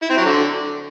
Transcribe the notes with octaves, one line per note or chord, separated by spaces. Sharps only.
E4
C4
F#3
D3